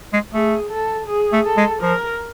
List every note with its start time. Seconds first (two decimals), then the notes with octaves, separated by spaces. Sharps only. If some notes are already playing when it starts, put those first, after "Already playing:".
0.13 G#3
0.32 A3 G#4
0.69 A4
1.07 G#4
1.33 A3
1.45 A4
1.57 G#3
1.82 F3 A#4